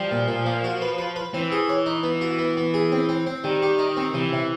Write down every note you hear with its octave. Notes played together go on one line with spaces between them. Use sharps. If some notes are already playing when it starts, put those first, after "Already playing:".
Already playing: F3 G3
A#2
A#2
A#3
F#4
B4
B4
B4
E3 C4
G#4
C#5
D#4
B3
F#4
B3
B3
G#4
C4
C4
C4
D#3 G3
G4
D#4
C4
C3 E3
C3